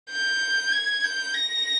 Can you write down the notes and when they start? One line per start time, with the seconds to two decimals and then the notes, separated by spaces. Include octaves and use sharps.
0.11 G6
0.72 G#6
1.04 G6
1.35 A#6